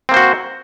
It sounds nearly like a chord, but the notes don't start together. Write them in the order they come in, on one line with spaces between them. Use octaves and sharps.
C4 A#3 C5 F#4